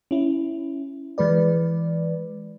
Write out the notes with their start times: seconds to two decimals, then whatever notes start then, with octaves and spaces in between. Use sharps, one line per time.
0.11 C#4 E4
1.18 E3 G#3 B4 D5